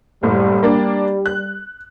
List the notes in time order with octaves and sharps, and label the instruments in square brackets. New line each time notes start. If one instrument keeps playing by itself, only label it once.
[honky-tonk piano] F#1 A2 [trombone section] G3
[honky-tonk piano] A#3 D4
F#6